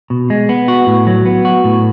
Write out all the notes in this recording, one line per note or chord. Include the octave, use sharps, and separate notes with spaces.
B2
G#3
B3
F#4
A2
F#3
B3
F#4
A2